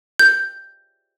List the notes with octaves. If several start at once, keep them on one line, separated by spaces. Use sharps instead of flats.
G6